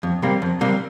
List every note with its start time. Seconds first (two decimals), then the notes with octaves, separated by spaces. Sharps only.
0.03 F2
0.22 C3 G3 A#3
0.42 F2
0.61 C3 G3 A#3